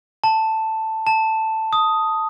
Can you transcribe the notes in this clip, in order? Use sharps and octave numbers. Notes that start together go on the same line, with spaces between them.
A5
A5
D#6